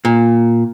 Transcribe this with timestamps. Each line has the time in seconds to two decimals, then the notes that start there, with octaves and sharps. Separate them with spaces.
0.05 A#2